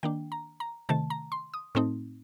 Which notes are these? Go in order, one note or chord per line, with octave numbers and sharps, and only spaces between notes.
D#3 A#3 D4 G5
A#5
A#5
C3 D#3 A3 A5
A#5
C6
D#6
A2 A3 C4 D#4